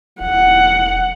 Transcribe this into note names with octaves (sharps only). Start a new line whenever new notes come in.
E1 F#5